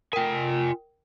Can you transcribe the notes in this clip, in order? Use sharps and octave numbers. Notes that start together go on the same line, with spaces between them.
F4 A#4 G5 G#5